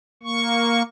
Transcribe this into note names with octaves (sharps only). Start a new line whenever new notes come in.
A#3 C#6